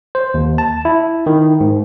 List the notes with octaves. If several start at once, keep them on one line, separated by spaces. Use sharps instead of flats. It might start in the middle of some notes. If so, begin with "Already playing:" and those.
C5
D#2
A5
E4
D#3
G#2